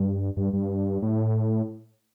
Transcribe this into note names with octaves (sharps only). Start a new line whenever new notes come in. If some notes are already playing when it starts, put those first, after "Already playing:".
Already playing: G2
G2
G2
A2